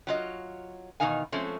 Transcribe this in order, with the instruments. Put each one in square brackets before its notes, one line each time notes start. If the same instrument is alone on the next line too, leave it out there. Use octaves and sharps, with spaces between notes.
[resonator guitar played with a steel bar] F#3 F4 D#5
B2 D#3 E3 D#4 F5 G#5
F3 G#3 A3 C4 C#4